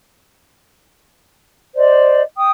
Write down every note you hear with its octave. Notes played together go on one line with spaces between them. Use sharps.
C5 D5 D#5
G5 D#6